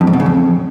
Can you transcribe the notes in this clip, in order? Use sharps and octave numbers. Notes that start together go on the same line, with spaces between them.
F2
G#2
B2
C#3
F2